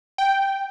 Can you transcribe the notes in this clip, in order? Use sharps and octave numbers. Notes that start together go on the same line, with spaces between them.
G5